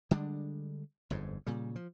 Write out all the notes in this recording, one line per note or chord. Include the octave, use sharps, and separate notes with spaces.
D3 G3 G#3 D4
G1 F2 G#2
A#2 C#3 G3
F3